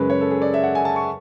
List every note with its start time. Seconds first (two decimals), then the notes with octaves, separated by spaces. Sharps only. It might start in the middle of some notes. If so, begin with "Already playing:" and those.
Already playing: F#2 C#3 G#3 B4
0.10 C#5
0.21 A4
0.31 G#4
0.42 D5
0.54 E5
0.64 F#5
0.75 G#5
0.85 A5
0.96 C#6